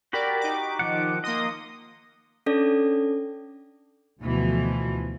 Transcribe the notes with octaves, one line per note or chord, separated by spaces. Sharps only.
F#4 G4 A#4 D5 B5
D#4 D6
D#3 F3 F#5
A#3 D#5 C6 D#6
C#4 D4 A4 D5
D2 B2 E3 F3